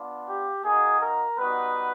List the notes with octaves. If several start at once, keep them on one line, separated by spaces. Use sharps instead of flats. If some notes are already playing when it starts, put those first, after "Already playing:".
Already playing: B3 D4 F4
G4
A#3 D#4 F#4 G#4
A#4
G3 B3 D#4 F#4 B4